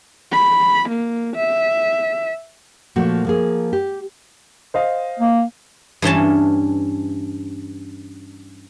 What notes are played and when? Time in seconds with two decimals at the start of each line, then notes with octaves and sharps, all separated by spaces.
0.32 B5
0.89 A#3
1.36 E5
2.96 A#2 F3 A3 A#3 F#4
3.25 F3 A#3 G#4
3.73 G4
4.74 C5 D#5 F5
5.20 A#3
6.02 G2 E3 C#4 A5